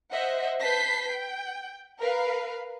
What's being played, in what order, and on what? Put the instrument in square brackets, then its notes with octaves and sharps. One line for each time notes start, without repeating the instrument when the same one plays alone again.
[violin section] C5 D#5 E5 F#5
B4 A5 G6 B6 C7
G5
A#4 B4 F5